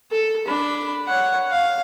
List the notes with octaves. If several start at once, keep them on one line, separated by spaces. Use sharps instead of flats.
A4
D4 B5
C#5 F#5
F5